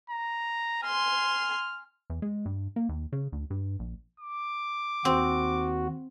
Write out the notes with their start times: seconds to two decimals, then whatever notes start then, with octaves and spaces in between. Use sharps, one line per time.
0.10 A#5
0.84 G#5 C6 F6
2.10 E2
2.22 G#3
2.46 G2
2.76 A#3
2.89 D#2
3.13 C#3
3.32 D2
3.50 G2
3.79 A#1
4.20 D6
5.05 D#2 C4 F#4